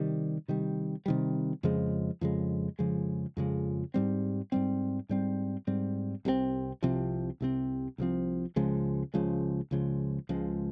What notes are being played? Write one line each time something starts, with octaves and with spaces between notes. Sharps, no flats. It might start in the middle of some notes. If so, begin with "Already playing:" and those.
Already playing: C3 D#3 G3
C3 D#3 G3
C3 D#3 G3
F2 C#3 F3 G#3
F2 C#3 F3 G#3
F2 C#3 F3 G#3
F2 C#3 F3 G#3
G#2 G3 C4
G#2 G3 C4
G#2 G3 C4
G#2 G3 C4
C2 C3 F3 C4
C2 C3 F3 C4
C2 C3 F3 C4
C2 C3 F3 C4
C#2 C#3 F3 G#3
C#2 C#3 F3 G#3
C#2 C#3 F3 G#3
C#2 C#3 F3 G#3